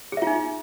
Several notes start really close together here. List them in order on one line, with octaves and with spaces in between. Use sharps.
G#4 E5 F4 D#4